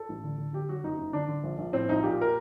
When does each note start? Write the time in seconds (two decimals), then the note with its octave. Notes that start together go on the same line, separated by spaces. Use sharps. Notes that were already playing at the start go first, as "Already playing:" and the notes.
Already playing: A4
0.09 A1
0.24 D3
0.38 D3
0.53 D3 G4
0.68 F#3 F#4
0.84 F#1 D#4
0.98 F#1
1.13 D3 D4
1.29 D3
1.44 A#1
1.58 A#1
1.73 A2 C4
1.89 A#1 D#4
2.03 A#2 G4
2.21 A#4